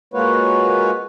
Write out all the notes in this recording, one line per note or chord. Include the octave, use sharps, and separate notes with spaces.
G#3 A#3 F4 F#4 B4 C#5